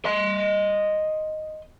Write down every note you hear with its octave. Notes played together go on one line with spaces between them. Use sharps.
D#5 C6